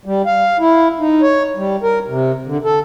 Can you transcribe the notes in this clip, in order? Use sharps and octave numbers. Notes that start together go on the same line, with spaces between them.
G3
F5
E4
D#4
C#5
G3
A#4
C3
D3
A4